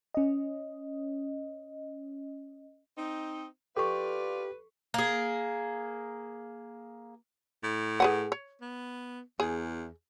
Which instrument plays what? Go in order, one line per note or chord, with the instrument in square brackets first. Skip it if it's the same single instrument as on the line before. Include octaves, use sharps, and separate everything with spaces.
[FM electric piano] C#4 D#5
[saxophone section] C4 D#4
[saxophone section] F4 D5 F5 [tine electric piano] G4 [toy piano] A4 C#6 [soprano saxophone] B4
[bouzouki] A#3 G#4
[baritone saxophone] A2
[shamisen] G#4 B4 F#5
C#5
[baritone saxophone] B3
[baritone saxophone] E2 [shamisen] G#4